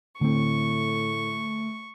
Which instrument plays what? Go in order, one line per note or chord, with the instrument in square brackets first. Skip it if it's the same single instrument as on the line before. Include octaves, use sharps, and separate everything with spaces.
[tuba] A2 [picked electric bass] D3 C4 [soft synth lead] A3 [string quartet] C#6